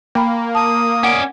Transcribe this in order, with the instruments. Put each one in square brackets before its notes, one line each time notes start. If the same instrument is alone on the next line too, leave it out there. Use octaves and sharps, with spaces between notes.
[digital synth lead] A#3 [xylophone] G5 B5
[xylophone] A5 [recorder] D#6
[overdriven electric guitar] C#4 D5 [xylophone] F#5